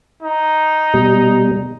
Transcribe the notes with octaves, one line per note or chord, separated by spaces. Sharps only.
D#4
B2 G3